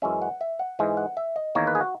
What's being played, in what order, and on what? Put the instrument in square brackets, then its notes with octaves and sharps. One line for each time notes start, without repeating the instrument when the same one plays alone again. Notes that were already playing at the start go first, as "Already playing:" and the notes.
[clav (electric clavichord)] F#2 E3 G#3 C#4 E5
F#5
E5
F#5
G#2 E3 G#3
F#5
E5
D#5
E2 D#3 A#3 C#5
B4
G#4
F#4